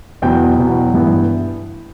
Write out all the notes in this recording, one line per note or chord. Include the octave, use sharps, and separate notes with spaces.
E2 B2 F#3 B3 G5
E2 B2 F#3 B3
G2 E3 B3